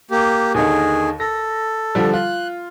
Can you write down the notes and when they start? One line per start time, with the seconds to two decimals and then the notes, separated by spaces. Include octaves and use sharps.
0.11 A#3 G4
0.54 D#2 D3 D#3 G#4
1.20 A4 A#6
1.95 D3 F3 G3
2.14 F4 F#6